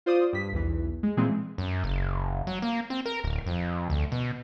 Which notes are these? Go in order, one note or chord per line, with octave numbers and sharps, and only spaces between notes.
F4 C5 D5 D#6
G2 B6
B1 E2 E3
G#3
A#2 E3 G#3 C4 G#4
F#2
F#1
F#3
A#3
C4
A#4
D1
F2
D2
B2